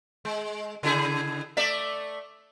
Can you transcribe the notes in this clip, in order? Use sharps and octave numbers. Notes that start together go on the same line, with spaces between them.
G#3
C#3 E4 G#4
A3 D5 E5